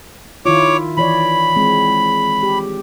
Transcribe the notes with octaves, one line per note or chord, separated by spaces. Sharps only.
D#3 E4 F4 C#5 D6
E3 C#5 D5 B5
G#3 C4
G4